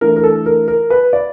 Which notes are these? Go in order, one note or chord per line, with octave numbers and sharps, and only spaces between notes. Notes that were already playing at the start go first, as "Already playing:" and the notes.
E3 A3 D4 A#4
A#4
A4
A#4
A#4
B4
D5